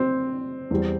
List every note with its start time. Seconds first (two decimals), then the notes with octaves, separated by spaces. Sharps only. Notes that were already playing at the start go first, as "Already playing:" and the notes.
Already playing: C4
0.71 E2 E3 G3